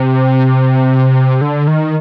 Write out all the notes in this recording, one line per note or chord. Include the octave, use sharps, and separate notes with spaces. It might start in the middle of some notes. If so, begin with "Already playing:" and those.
Already playing: C3
D3
D#3